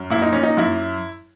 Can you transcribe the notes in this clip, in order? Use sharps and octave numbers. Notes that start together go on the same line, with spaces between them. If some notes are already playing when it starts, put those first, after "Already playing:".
Already playing: F#2
A#2 E4
D#4
A#2 C#4
D#4
F#2 E4